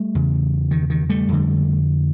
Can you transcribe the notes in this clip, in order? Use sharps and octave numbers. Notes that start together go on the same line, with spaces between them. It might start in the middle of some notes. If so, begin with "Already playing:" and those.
Already playing: G3 A3
E2 C#3
D#3
D#3
G3 A3
F2 D3